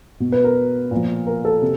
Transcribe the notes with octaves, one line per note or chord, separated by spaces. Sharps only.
B2
B4
A#4
A#2 F3
A#4
A4
C3